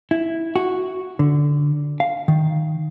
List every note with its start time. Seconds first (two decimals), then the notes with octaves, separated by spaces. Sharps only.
0.11 E4
0.56 F#4
1.19 D3
2.00 F5
2.28 D#3